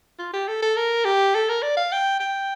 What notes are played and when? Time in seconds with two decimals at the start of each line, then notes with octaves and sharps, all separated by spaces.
0.19 F4
0.33 G4
0.48 A4
0.62 A4
0.76 A#4
1.05 G4
1.35 A4
1.49 A#4
1.63 D5
1.77 F5
1.92 G5
2.20 G5